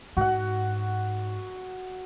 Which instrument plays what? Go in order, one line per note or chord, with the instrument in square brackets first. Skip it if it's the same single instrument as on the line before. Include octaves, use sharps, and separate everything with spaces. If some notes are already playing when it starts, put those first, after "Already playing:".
[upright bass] G#2 [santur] F#4 F#5